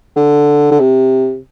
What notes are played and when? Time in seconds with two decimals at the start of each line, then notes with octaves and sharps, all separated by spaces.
0.16 D3
0.71 D3
0.80 C3